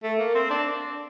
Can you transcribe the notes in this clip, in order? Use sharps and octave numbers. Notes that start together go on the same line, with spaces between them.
A3
A#3
C4
D4